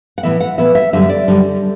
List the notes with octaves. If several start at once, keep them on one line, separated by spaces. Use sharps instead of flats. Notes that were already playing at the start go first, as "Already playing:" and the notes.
F#5
A2 E3 B3 E5
F#5
A2 E3 B3 E5
E5
F#2 D3 G3 E5
D5
F#2 D3 G3